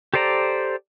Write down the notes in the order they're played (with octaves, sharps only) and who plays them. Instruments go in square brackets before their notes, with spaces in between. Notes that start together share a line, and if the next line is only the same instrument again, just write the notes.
[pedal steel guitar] G4 A4 C5 D5 A#5